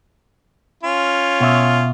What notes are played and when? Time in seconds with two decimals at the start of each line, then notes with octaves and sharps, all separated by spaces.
0.83 C#4 F4
1.41 B2 E5